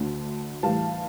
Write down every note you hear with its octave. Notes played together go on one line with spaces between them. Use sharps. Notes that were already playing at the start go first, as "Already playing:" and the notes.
Already playing: D2 D3 A3
A2 E3 G3 F5 A5